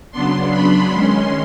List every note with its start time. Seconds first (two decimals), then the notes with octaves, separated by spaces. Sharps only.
0.11 C#3 F#3 B3 D4 C6
0.51 B5
0.90 D#3 G#3 C#4 C6